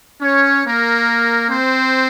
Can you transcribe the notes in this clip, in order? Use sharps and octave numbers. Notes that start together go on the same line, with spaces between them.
C#4 C#5
A#3 A#4
C4 C5